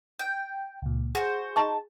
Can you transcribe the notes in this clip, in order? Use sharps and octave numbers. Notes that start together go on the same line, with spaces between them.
G5
C#2 A#2
F#4 G#4 C5
D#4 A5 C#6